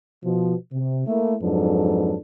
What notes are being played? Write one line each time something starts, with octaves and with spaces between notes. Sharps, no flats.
B2 F3
C3
A3 A#3 E4
F2 G#2 F#3 D4 A4 B4